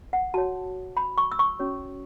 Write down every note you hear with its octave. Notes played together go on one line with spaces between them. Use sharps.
F#5
F#4 C#5 A5
B5
C#6
E6
C#6
C#4 F#4 C#5